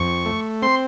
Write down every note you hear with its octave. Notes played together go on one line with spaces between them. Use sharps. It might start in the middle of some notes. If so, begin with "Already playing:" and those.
Already playing: F2 C#6
A3
C4 C6